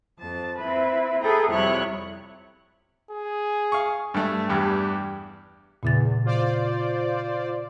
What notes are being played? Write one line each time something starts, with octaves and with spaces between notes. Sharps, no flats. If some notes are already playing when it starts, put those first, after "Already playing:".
F2 A5
C4 E4 B4
E4 G#4 A4 B4 G5 A#5
F2 C3 G3 E4 C#5 F#6
G#4
F5 C#6
G2 A3
E2 G2 G4
E2 A#2 C#3 A6
F4 C5 D5